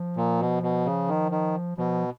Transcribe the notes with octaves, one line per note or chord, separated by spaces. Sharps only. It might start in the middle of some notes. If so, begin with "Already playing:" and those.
Already playing: F3
A#2
B2
B2
C#3
D#3
D#3
B2 F3